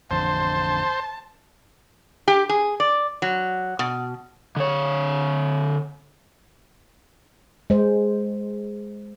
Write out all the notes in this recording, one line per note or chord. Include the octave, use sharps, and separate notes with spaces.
A1 F2 D3 C5 A5
G4
G#4
D5
F#3
B2
D3 C#5
G#3 C5